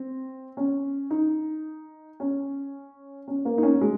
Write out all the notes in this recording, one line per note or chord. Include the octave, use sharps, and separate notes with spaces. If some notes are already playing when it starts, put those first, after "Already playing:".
Already playing: C4
C#4
D#4
C#4
C#4
A#3
D#4
C#4
G#3